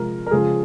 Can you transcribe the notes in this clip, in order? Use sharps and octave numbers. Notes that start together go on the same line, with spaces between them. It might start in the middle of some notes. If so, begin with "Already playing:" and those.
Already playing: C3 F3 G#3 A#4
A#4
C#3 F3 G#3 G#4